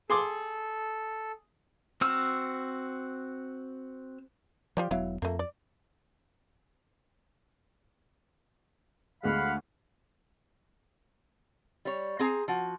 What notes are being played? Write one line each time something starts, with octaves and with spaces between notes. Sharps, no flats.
G#4 A4 C6 D6
C4 F#4 E6 F6
F3 F4 G4 D5
E1 F#3 B3 E4 F5
F2 A3 A#3
D5
D2 G#3 F5 F#5 B5
G3 C#5
C4 G#4 A#5
F3 F#4